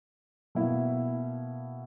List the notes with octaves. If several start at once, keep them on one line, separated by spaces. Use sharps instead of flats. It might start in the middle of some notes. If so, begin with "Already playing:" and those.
B2 A#3 E4